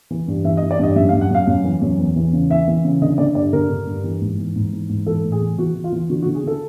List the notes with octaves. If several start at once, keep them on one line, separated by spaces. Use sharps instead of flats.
E3
G2
E3 E5
D#5
E3
D5
G2 D#5
F#2 E5
F5
F#2
F#5
F#2 F5
F#2
E3
F#2
E2
E3
C#3
E3 E5
E3
C#3
D3 D#5
D3 D5
G2 D5
D3 A#4
D3
G2
E3
G#2
E3
G#2
E3
G#2
E3 A4
A2
G#4
E3
E3 F#4
E3
F4
E3
D3 F#4
F#4
D3
G#4
D3 A4